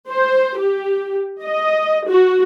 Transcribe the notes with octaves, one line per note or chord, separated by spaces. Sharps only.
C5
G4
D#5
F#4